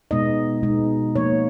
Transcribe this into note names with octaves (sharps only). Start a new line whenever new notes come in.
B2 G#3 B3 D#4 D#5
B2 G#3 B3 D#4
F3 A#3 D#4 C#5